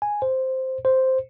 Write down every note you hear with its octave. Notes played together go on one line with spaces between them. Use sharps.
G#5
C5
C5